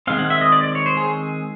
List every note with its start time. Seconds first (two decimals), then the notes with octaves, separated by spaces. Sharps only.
0.07 D#3 G#3 C4 F5
0.19 F#5
0.30 E5
0.41 D#5
0.52 D5
0.63 D5
0.75 C#5
0.86 C5
0.97 G#4